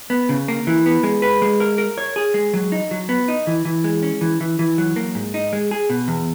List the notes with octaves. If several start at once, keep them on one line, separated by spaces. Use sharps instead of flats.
B3
C#3
A#3
E3
B3
G#3
B4
G#3
A#4
A#4
C#5
G#4
G#3
F#3
D#4
F#3
B3
D#4
E3
E3
G#3
C#4
E3
E3
E3
F#3
A#3
G#2
D#4
G#3
G#4
B2
E2